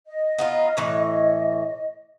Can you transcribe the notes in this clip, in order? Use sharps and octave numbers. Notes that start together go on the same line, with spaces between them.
D#5
B3 D#4 F4
A2 E3 C#5